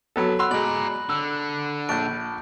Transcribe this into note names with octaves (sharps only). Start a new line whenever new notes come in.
F#3 B3 A4
F#4 B5 C6 E6 F#6
B2 G#3 D5 A#5 F#7
D3 E6
A#1 A5 G6 D7